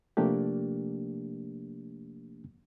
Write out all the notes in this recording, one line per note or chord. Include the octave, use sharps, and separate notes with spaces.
C3 F3 A3 A#3 D4 G4